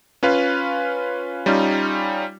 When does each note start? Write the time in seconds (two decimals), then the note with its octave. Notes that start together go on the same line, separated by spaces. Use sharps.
0.23 C#4 F4 B4 F5
1.46 G3 C#4 D#4 F4